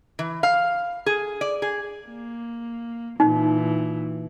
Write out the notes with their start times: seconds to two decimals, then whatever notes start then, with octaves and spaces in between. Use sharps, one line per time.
0.19 E3
0.43 F5
1.06 G#4
1.41 D5
1.62 G#4
2.08 A#3
3.20 A#2 E3 D#4